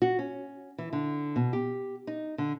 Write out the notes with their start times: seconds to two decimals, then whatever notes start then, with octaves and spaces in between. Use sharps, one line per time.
0.02 F#4
0.19 C#4
0.78 E3
0.93 D3
1.36 B2
1.53 G4
2.07 D#4
2.38 D3